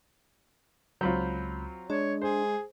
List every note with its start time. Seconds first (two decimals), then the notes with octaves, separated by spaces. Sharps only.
1.01 C#2 F#3 C4 F4 B5 G6
1.90 G#3 D4 C#5
2.21 G#4 C5